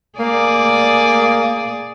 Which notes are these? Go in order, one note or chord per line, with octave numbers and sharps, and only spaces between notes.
A#3 G#4 D5